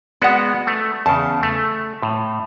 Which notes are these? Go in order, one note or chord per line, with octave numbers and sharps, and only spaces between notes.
G#3 B3 F#4 D5 F#5
A3
E2 C#3 A5
A3
A2